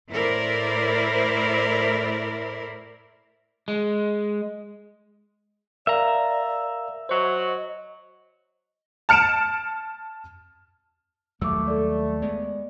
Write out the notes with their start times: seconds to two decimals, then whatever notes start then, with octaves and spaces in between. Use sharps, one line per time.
0.10 A2 E4 A#4 C5 D5
3.68 G#3
5.87 A#4 D5 E5 F5 A#5
7.09 F#3 C5 D#5
9.09 A5 F6 C#7 D7 E7
11.41 D#2 F#3 G3 A3 D6 E6
11.68 A4 D5
12.22 G#3 B3 D5